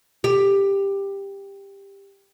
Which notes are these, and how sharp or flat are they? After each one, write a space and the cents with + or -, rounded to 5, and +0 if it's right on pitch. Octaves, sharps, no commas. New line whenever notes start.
G4 +10